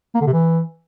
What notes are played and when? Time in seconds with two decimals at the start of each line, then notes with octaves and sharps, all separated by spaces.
0.15 A#3
0.21 D3
0.27 C3
0.33 E3